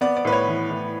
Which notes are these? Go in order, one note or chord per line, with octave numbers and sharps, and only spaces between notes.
B3 D5
D5
A2 B4
C#5
E3
A2